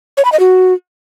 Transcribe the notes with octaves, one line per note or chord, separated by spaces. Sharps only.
C#5
B5
D#5
F#4